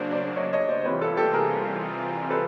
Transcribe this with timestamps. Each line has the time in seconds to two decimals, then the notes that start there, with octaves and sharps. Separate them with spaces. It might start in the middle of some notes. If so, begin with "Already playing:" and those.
Already playing: C#3 F#3 A#3 D4 C5 D5
0.12 C5 D5
0.36 C#5 D#5
0.53 C#5 D#5
0.68 C5 D5
0.80 C5
0.85 C3 E3 G3 C4 F4 B4 C#5
1.01 A4 B4
1.17 G4 A4
1.34 G#4 A#4
2.30 A4 B4